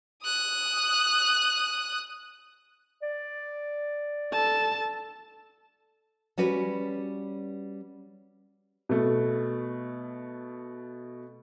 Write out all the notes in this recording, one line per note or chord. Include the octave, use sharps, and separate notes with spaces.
D#6 F#6
D5
A4 A5
G3 C#4 F#4 B4
B2 A3